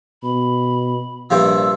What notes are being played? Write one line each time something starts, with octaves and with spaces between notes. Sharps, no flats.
B2 B5
A#1 G2 C3 F3 E6